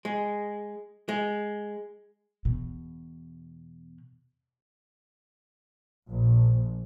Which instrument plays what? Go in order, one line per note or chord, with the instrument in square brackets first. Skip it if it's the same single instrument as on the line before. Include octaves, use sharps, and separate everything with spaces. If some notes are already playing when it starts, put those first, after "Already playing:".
[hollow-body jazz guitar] G#3
G#3
[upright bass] E2 B2
[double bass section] A#1